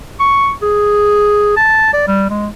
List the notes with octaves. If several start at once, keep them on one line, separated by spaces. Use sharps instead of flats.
C#6
G#4
A5
D5
G3
G#3